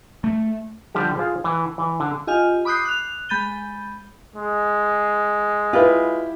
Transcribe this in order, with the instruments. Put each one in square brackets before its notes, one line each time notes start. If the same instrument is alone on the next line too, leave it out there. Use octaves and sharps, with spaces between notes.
[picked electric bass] A3
[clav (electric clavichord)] D3 F3 G3 G4
F4 G#4 C5
E3
E3
D3
[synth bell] F4 G4 D#5 G#5 F6
B5 D6 D#6 F#6 G6 C7
F#6 F7
G#3 B5 G6 A6 D#7 G7
[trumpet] G#3
[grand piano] E4 G4 [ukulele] F4 B4